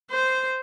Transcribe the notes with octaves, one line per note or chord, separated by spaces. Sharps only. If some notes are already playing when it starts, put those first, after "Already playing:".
C5